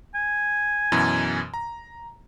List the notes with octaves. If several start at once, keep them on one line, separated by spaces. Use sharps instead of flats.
G#5
F#2 B2 E3
A#5